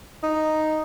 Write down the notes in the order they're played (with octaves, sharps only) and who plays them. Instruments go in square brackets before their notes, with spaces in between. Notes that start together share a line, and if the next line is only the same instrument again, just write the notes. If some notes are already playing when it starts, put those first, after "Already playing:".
[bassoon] D#4